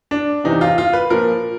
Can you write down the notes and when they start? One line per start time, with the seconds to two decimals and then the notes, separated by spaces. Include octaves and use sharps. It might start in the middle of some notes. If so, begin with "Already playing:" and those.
0.11 D4
0.44 E2 C3 E3 D#4
0.61 F4
0.78 F4
0.93 B4
1.10 A#2 F3 A#4